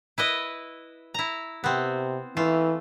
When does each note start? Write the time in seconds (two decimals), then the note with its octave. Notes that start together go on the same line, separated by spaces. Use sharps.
0.18 E4 B4 D#5
1.14 E4 A#5
1.64 C3 B3 C4
2.37 E3 A3 F4